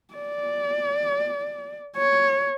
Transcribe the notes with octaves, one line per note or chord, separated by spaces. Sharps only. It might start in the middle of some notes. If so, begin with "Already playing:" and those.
D5
C#5